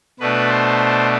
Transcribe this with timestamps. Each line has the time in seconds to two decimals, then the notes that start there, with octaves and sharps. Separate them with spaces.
0.20 B2 A3 D4 B4
0.49 C5